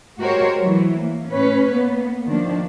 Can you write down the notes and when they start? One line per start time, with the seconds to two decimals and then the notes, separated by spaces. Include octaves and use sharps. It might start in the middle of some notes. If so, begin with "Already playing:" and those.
0.19 G#3 F#4 G4 A#4 C5 C#5
0.61 E3 F#3
1.00 A#3
1.30 A2 C#4 B4 C#5
1.72 A#3 B3
2.28 D#3 F3 A#3 D4